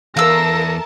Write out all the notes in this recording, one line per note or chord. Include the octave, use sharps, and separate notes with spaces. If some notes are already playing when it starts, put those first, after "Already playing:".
E2 A4 A#4 E5 F5 A5 E6 A#6